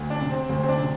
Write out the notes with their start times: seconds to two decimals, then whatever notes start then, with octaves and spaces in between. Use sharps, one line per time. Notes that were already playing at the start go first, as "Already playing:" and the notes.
Already playing: D2
0.10 D4
0.21 C3
0.30 C4
0.49 D2 C4
0.63 C4
0.69 D4
0.78 C3